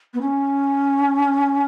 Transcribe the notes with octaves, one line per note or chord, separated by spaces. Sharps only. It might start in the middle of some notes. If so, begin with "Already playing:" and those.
B3
C#4